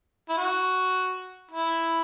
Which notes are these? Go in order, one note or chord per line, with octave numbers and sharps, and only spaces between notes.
E4
F#4
E4